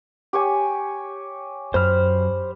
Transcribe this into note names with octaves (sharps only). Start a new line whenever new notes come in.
G4 C#5 G#5
F#2 C5 B5 F6